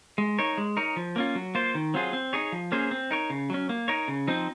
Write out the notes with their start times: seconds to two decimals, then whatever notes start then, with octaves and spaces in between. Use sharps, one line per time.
0.18 G#3
0.38 D#4 A#4 C#5
0.58 G#3
0.77 D#4 A#4 C#5
0.96 F3
1.16 A#3 C#4 F4
1.35 F#3
1.55 A#3 F4 C5
1.75 D#3
1.94 F#3 C4 F4 G#4
2.13 C4
2.33 D#4 G#4 C#5
2.52 F3
2.72 A#3 C#4 G#4 C5
2.91 C4
3.11 D#4 A#4 C#5
3.30 C#3
3.50 F#3 C#4
3.69 A#3
3.88 D#4 A#4 C#5
4.08 C#3
4.28 F3 C4 D#4